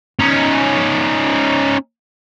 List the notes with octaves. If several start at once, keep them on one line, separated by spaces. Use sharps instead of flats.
C#4 D#4